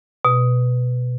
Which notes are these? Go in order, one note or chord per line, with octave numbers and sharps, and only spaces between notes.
B2